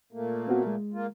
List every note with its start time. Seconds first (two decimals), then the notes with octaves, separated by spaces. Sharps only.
0.13 A#2 A3 A#3
0.48 B3 C4 F#4
0.67 G#3
0.93 A#3 F4